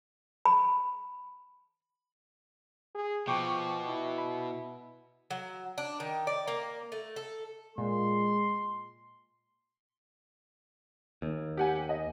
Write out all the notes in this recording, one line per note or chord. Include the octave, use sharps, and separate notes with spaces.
B5
G#4
B2 F3 G5 C#6 D6
E4
B5
F#3
D4
D#3
D5
A#3
A3
A4
A#2 G#3 C6
D#2
G4 F#5 G#5
D#5